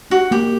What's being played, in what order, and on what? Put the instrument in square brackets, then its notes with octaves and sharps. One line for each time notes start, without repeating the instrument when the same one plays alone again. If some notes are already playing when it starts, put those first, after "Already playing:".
[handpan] D4 [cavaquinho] F#4
[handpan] A#3 [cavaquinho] G4